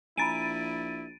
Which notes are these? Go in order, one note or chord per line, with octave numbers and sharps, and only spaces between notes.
A#1 E4 G#5 A#5 B5 A6 D7 D#7